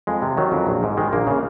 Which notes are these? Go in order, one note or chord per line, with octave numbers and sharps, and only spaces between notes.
F2 G#3
C3
D#3 F#3
F2
A#1
G#2
D#3 G#3
A#1 A#3
C#3